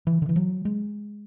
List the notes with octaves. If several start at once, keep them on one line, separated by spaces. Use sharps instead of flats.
E3
D3
E3
F#3
G#3